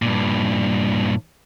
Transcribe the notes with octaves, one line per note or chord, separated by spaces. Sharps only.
G2 A#2